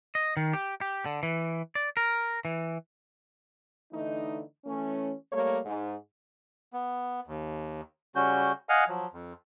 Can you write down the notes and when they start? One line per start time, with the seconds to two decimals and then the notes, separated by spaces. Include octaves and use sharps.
0.15 D#5
0.37 D#3
0.53 G4
0.81 G4
1.06 D3
1.23 E3
1.75 D5
1.97 A#4
2.45 E3
3.93 D3 E3 A3 D#4
4.66 E3 A3 C#4
5.32 G3 A3 A#3 C#5
5.65 G#2
6.73 B3
7.27 D#2
8.16 C#3 G3 C#4 F#4 G6
8.69 D#5 F5 F#5 G#5 F6
8.88 F3 F#3
9.13 F2